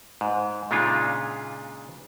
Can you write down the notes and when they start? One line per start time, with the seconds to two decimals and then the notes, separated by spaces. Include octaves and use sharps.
0.21 G#2
0.71 A#2 C#3 G#3 D4 D#4 F4